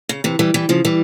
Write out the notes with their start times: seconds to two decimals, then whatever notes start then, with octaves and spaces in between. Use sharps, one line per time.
0.09 C#3
0.24 C3 E3
0.39 E3 G3
0.54 E3 G3
0.69 C#3 F3
0.85 E3 G3